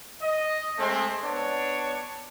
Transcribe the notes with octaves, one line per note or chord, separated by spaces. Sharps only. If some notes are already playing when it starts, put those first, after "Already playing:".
D#5
G#3 A3 C4
B3 D4 C#5